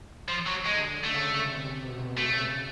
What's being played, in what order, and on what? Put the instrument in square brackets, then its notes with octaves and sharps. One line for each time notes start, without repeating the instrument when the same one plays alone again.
[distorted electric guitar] F3
F#3
[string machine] D3 [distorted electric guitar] G#3
[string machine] C#3 [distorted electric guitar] A3
[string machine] C3
B2
[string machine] C#3 [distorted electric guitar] A3